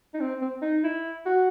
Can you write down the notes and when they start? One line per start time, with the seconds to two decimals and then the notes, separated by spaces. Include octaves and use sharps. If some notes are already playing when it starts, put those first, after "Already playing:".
0.14 D#4
0.20 C4
0.42 C4
0.62 D#4
0.84 E4
1.26 F#4